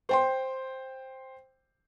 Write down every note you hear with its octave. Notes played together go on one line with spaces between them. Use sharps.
C5 G5 C6